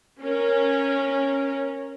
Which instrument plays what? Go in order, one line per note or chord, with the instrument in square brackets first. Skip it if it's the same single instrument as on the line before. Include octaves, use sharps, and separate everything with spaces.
[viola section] C#4 A#4